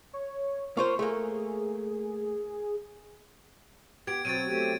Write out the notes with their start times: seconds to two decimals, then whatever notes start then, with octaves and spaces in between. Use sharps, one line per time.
0.13 C#5
0.77 A#3 F4 C5 C#6
0.99 A3 A#3 G#4
4.07 B3 G4 G#6 D7
4.25 B2 F#3 C4 A6 D7 D#7
4.47 A3 C4 G4